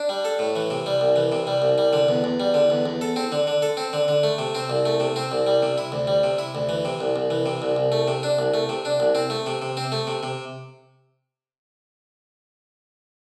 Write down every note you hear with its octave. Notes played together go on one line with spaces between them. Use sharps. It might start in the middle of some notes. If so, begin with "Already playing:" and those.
Already playing: D4
G3
A4
A2
E3
C3
G3
C2
E3
C3
G3
C2
G3
D3
E2
E2
G3
D3
E2
E2
A4
C4
D3
D3
A4
C4
D3
D3
A3
C3
C4
C2
A3
C3
C4
C2
G3
C3
E4
D2
G3
C3
E4
D2
E3
C3
C2
C2
E3
C3
C2
C2
A3
C3
D4
C2
A3
C3
D4
C2
C4
A3
C3
C3
C4
A3
C3
C3